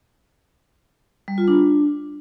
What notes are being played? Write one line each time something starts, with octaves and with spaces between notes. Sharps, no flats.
G3
F4
D4